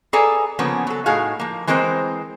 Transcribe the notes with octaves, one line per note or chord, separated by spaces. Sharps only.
G#4 A4 B4 D5 G#5 A#5
C#3 F3 A#3 B3 C#4
F#3 A4
A2 D#4 F#4 G#4 F5
F3 A#3
E3 G#3 C4 A#4 C5